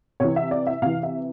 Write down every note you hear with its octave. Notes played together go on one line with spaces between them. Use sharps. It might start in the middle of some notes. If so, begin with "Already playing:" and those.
C3 E3 C#5
E5
D5
E5
C3 E3 F5
E5